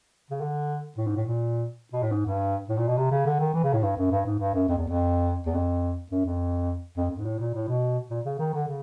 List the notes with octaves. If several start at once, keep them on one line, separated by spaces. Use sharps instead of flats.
C#3
D3
A2
G#2
A2
A#2
B2
A2
G#2
G2
A2
A#2
B2
C3
C#3
D3
D#3
E3
C#3
A2
G2
F#2
G2
G#2
G2
F#2
F2
E2
F2
E2
F2
F#2
F2
F2
F2
G#2
A2
A#2
A2
B2
A#2
C#3
D#3
D3
C#3